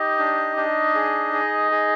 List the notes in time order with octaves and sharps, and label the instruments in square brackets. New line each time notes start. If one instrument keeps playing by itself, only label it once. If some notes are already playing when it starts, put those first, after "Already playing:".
Already playing: [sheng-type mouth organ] D#4 G4 D#5
D4
D4
G#4
G#4
G#4